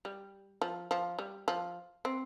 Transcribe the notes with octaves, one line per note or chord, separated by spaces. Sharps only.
G3
F3
F3
G3
F3
C4